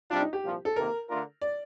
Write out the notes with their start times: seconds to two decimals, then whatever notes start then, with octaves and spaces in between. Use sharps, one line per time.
0.10 C3 G3 D4 F4
0.22 D#4
0.33 G4
0.44 C2 A#2 F3
0.65 A4
0.76 C3 D#3 A#3 A#4
1.10 D3 A3 D4 F4 A#4
1.41 D5